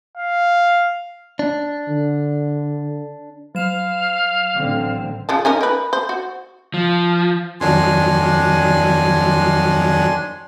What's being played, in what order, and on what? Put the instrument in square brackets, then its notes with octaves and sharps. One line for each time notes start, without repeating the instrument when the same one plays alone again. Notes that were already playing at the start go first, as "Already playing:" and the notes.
[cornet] F5
[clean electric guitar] D4
[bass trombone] D3
[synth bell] F#3 E7 [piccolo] F5
[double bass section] A1 D3 C4
[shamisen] C#3 F3 A5
C#4 D#4 A#4
A#4 B4
C5
F#4
[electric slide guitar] F3
[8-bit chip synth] F2 D#3 F#3 [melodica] D4 G#5 C6